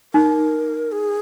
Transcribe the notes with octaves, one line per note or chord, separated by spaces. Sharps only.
D#4 A#4
G#4